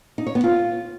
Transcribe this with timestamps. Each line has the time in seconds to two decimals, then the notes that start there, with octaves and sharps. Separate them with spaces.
0.18 D#4
0.27 C#5
0.35 B3
0.44 F4